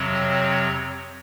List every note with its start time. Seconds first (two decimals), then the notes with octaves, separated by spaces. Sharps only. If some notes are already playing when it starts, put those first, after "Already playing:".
Already playing: F2 C3 F#3 C4 C#5